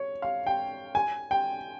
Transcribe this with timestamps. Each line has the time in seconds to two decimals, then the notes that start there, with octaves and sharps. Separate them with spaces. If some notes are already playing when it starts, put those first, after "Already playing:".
Already playing: C#5
0.22 F5
0.47 G5
0.95 G#5
1.31 G5